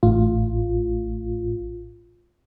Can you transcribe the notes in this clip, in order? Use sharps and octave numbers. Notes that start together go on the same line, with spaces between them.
A1 A2 F4